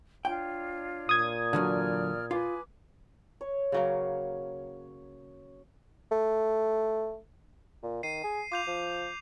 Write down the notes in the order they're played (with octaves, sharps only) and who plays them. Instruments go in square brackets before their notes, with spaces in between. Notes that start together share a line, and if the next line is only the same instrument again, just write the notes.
[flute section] D4 F4 C#5 [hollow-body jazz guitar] G5
[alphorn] A#2 [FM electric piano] D#6 G#6
[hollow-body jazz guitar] D3 E3 F#3 [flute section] D5 F6
[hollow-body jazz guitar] F4 [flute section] B4 G#5 D6
[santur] C#5
[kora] C#3 F#3 A#3
[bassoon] A3
A#2
[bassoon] D#3 [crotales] C7 D#7
[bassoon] G#4
[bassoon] F4 [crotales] D6 G6 F7
[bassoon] F3